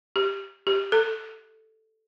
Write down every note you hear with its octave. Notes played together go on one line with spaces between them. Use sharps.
G4
G4
A4